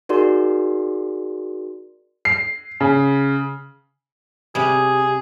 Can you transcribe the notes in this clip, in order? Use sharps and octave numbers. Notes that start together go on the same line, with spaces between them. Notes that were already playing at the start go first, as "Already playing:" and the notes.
D#4 F#4 G#4 A#4 D5 C6
C7
C#3
C3 G3 G#4